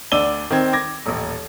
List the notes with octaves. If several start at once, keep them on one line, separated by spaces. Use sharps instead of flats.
D2 D4 D5 E6 D#7 G7
D#3 C4 G#6
D6 G#6 A#6
D#1 A1